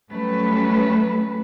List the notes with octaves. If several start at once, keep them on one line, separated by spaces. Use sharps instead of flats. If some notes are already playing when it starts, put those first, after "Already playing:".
F#3 G3 A3 C#4 B4